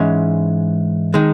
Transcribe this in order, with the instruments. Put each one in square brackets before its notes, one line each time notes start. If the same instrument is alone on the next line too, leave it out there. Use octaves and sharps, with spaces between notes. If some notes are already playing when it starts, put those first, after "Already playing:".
Already playing: [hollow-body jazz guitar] G#2 E3 G#3 C#4
D#3 G#3